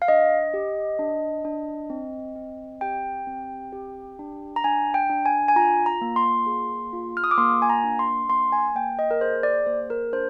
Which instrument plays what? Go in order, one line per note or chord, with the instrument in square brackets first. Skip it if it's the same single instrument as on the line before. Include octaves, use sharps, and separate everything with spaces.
[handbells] F5
D4 D#5
G4
D4
D4
C4
C4
G4 G5
C4
G4
D4
A#5
D4 G#5
G5
D4
G#5
G#5
F4 A#5
A#5
A#3
C6
G#4
F4
F6
D#6
D6
A#3 C6
G#5
A#5
D4
C6
A#3 C6
G#5
A#3 G5
D#5
A#4
G#4 C5
D5
A#3 C5
A#4
D4 C5